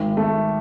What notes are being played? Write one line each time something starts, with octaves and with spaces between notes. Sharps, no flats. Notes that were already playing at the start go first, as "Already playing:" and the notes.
Already playing: G#1
A3